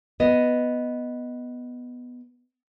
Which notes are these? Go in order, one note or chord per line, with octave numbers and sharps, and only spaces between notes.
B3 D#5